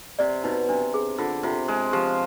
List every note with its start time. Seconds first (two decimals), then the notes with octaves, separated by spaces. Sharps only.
0.19 C3 D5
0.44 B2 D#4
0.69 C3 D4
0.94 G#4
1.18 D3 F4
1.43 C3 F4
1.68 G#3 B4
1.93 F3 G4